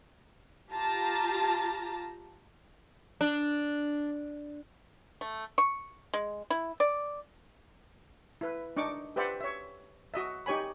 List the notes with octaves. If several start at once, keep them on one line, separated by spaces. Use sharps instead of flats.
F4 G4 A5 A#5
D4
A3
C#6
G#3
E4
D5
E4 B4
D4 D#4 C#6 D6
G4 B4 C5 D5 E5 F#5
C#5 E5
F#4 D#5 E5
D#4 G4 C#5 G#5 B5